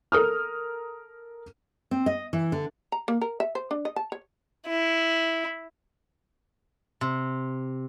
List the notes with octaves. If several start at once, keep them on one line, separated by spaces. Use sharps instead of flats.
A4 A#4 D#6 F6
C4
D#5
E3
D3
A#5
A#3
A#4
E5
C5
D4
D#5
A5
C#5
E4
C3